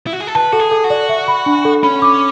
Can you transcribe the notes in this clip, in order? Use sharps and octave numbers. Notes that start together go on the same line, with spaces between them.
E4
F#4
G#4
A4
B4 A5
F#4 A4
G#4
A4
F#4
D5
E5
B5
D4
A4
C#4 B5
D6